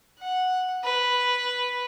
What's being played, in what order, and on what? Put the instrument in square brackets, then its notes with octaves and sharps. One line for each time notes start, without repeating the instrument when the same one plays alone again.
[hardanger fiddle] F#5
B4